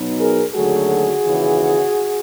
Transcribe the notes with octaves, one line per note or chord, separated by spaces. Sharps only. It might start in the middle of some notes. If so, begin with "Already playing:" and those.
Already playing: B2 F#3 B3 D#4
G#4 A#4
D#2 D3 F#3 A3 F#4 G#4
D#2 C#3 E3